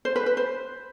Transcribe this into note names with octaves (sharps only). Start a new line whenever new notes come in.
C5
B4
B4
C5